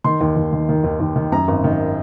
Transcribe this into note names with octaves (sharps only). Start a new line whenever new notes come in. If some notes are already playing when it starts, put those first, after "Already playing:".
D#3 C6
D#2
D#2
D#3
D#3
D#2
D#2
D#3
F#2 A#5
G#1
D#3